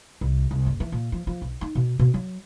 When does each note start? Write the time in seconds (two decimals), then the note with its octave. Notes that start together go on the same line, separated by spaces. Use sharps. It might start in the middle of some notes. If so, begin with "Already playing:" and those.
0.21 C2
0.51 C2
0.66 F#1
0.80 E3
0.92 A#2
1.12 F3
1.27 F3
1.42 B1
1.61 D#4
1.75 B2
1.99 B2
2.14 F#3